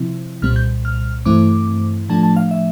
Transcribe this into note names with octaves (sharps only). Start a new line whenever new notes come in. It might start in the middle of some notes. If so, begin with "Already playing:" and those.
Already playing: C3 F3 C4 E4
C2 A#2 G3 C4 F6
G6
F6
G2 E3 A3 C4 E4 D6
A2 F3 A3 D4 A5
A5
F5
E5